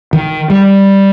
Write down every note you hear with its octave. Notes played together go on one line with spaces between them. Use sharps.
D#3
G3